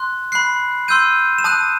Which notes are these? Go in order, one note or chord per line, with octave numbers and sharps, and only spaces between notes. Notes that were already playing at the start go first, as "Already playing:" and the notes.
Already playing: C6 F#6
B5 F#6 C7
C6 E6 G6 D#7
E7
A5 D#6 F#6 D#7